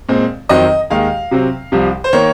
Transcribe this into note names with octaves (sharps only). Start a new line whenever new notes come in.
A#2 G#3 C4
F2 D#3 F#3 C4 D#5
D#2 D#3 G#3 F5
C3 F#3 C4
C2 C3 F3
C5
D#3 A#3 C#5